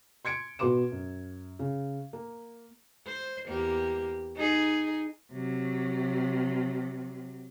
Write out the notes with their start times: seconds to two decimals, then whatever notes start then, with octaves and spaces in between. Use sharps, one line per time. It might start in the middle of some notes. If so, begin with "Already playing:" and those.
0.25 C6 G#6 C#7 D7
0.59 B2 F#4 B4 C6 D6 E7
0.92 F#2
1.59 C#3
2.13 A#3
3.06 C5
3.46 E2 A#3 G4
4.36 D#4 G#4
5.33 C3 F#3